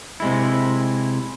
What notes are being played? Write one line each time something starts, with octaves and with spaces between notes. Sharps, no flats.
C3 G#3 E4